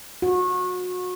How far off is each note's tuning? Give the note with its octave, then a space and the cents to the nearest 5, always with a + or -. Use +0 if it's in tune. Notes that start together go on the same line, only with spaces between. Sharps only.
F#4 -30